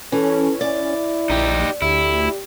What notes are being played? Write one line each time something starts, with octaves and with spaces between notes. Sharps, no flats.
E3 C#4 A4
E4 D5
A#1 D#4 G4
D2 E4 G4